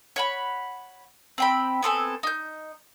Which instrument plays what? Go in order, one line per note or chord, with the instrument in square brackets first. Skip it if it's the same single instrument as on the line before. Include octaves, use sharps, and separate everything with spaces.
[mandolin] C#5 F#5 B5
C4 G5 B5
B3 C4 A4 G#5
D#4 G6